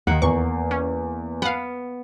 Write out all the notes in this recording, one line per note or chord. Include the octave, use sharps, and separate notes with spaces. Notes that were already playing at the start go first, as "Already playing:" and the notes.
D#2 D#3 A#3 F#5
E2 C#6
C#4
B3 F5 F#5